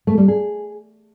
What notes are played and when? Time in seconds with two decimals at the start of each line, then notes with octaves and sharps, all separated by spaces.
0.07 A3
0.18 G3
0.28 G#4